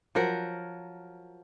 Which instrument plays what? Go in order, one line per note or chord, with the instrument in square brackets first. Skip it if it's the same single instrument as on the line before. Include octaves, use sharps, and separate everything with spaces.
[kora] F3 F#3 A#4 F#5